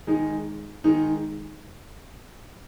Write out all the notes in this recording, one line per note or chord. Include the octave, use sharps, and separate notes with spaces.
D#3 G#3 D#4
D#3 G#3 D#4